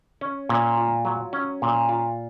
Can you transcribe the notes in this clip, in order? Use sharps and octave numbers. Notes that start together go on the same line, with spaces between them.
C#4
A#2
F4
F#3
C#4
A#2
F4